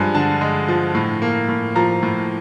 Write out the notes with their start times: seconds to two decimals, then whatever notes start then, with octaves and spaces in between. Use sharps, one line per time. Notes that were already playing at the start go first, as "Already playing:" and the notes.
Already playing: G2 F3 G#3 G#5
0.15 D3 A5
0.41 G#3
0.68 F3
0.95 A2
1.22 A#3
1.48 A2
1.75 F3 A#5
2.03 A2